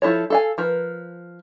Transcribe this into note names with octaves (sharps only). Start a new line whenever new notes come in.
F3 E4 A4 C#5
A4 F5 G#5
F3 A#4 B4